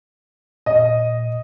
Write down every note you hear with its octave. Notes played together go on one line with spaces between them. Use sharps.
A#2 D#5